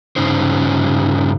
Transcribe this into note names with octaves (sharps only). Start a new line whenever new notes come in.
G2 C#3 C#4 D#4 C5